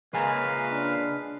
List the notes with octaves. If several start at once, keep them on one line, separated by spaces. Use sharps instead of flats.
A#2 C#3 G#3 B4 F5 G#5 A#5
D4